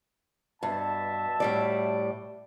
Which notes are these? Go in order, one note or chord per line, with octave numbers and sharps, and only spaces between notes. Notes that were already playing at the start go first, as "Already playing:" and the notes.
G2 B2 E5 A5
A2 G3 D5